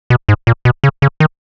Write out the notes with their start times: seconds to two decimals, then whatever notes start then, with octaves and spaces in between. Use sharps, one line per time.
0.10 B2
0.29 G#2
0.47 A#2
0.65 B2
0.84 C#3
1.02 C#3
1.20 D#3